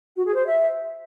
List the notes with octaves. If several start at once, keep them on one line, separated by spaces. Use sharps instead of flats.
F#4
G#4
C5
E5